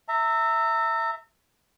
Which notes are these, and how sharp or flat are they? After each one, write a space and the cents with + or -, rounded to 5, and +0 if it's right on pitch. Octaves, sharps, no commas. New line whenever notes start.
E5 +0 A#5 -35